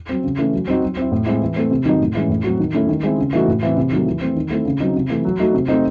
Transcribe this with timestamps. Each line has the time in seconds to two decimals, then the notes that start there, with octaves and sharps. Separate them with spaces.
0.09 F#3 C4
0.24 C#3
0.38 E3 A3 C#4
0.53 F#3
0.68 C4 D#4 F#4
0.83 F#3
0.97 C4 E4
1.12 A2
1.26 G#3 C4 E4
1.41 E3
1.56 A3 C4
1.71 C3
1.85 D#3 F#3 C4 D#4
2.01 A2
2.15 E3 G#3 C#4
2.29 A2
2.44 F#3 C4 F#4
2.59 D#3
2.74 A3 C#4 E4
2.88 D#3
3.03 G#3 C4 E4
3.18 C#3
3.33 E3 A3 D#4 F#4
3.47 A2
3.63 E3 C4 E4
3.77 C3
3.92 D#3 F#3 A3
4.06 E3
4.21 A3 C4
4.36 D#3
4.50 A3 C4 E4
4.65 C#3
4.80 F#3 C4 D#4
4.95 C3
5.10 E3 A3
5.25 F#3
5.40 A3 D#4 F#4
5.54 C3
5.68 F#3 A3 C4 D#4